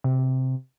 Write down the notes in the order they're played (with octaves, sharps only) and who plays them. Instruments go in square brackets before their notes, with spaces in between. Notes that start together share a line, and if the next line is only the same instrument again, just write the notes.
[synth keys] C3